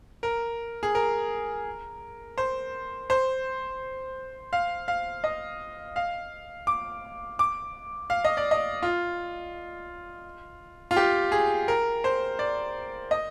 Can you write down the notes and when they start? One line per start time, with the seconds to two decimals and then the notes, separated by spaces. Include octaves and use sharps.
0.23 A#4
0.83 G#4
0.95 A#4
2.38 C5
3.10 C5
4.53 F5
4.88 F5
5.24 D#5
5.96 F5
6.67 D6
7.39 D6
8.10 F5
8.25 D#5
8.37 D5
8.51 D#5
8.83 F4
10.91 F4
10.96 G4
11.32 G#4
11.68 A#4
12.04 C5
12.39 D5
13.11 D#5